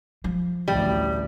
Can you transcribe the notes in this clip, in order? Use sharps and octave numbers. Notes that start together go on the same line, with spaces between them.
F3
A1 D2 G3